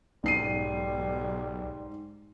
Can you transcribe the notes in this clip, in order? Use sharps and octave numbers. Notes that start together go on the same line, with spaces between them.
B1 G#2 G3 C7 D#7